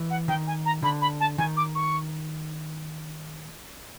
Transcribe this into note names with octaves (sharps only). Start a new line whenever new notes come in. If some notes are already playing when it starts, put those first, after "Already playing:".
Already playing: E3
F#5
D#3 G5
G#5
A#5
D3 B5
B5
A5
D#3 G#5
D6
C#6